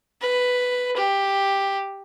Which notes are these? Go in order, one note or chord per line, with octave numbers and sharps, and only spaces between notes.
B4
G4